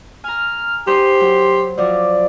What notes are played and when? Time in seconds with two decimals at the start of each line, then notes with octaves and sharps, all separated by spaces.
0.24 G#5 A#5 F6
0.87 G4 C5 C6 D#6
1.20 F#3
1.78 F3 F#3 D5